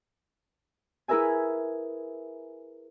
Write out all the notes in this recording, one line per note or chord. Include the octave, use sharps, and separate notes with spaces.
E4 G#4 A#4 B4 E5 G#5